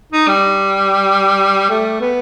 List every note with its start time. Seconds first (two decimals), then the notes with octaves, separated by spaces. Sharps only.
0.12 D#4
0.28 G3
1.70 A3
2.01 B3